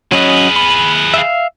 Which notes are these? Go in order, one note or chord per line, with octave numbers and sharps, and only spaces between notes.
F#3 C#4 G#4 B4 D#5
B5
E5 F5